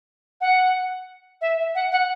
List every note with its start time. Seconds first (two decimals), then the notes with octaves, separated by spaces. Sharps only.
0.41 F#5
1.41 E5
1.58 E5
1.75 F#5
1.92 F#5